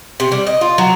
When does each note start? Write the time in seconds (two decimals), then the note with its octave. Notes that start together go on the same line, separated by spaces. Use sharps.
0.20 C3
0.32 G3
0.47 D#5
0.61 F4
0.78 F#3